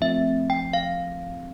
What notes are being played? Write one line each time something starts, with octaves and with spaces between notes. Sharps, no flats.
F3 A3 C4 E5
G5
F5